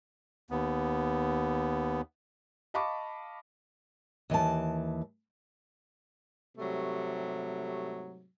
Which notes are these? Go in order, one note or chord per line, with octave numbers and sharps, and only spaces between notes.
D#2 B3
D#5 F5 A5 B5 C#6 D6
D#2 E3 C5 A5
G#2 C3 F#3 G3 A3